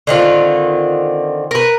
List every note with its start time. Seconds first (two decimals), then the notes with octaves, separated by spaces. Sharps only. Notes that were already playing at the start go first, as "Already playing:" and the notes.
0.07 D3 D#3 C4 F4
1.51 A#4 B4